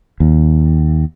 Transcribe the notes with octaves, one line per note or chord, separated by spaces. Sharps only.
D#2